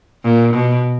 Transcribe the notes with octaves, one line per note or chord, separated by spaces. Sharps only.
A#2
B2